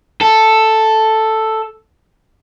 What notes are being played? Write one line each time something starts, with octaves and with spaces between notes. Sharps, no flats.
A4